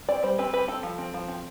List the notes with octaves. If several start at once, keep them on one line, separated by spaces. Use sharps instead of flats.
C4 D5
G3 C5
C4 B4
G3 B4
C4 A4
F3
C4
F3
C4